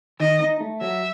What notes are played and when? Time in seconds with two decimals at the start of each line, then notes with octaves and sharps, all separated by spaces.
0.20 D#3 D#5
0.40 D#4
0.60 A3
0.81 F#3 E5